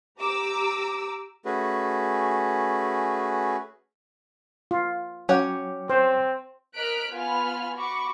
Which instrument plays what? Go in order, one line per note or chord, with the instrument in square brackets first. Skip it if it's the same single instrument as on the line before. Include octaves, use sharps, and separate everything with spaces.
[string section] G4 A#5 D6 E6
[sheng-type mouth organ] A3 C#4 F#4 G#4 B4
[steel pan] F4
[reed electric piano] F#3 G5 D6 [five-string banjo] C#4 C#5 F#5
[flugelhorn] C4 [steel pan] C5
[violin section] A#4 D#5 F6 F#6 B6 D7
B3 F4 G#5 B5 F6
F#4 B5 C#6 D6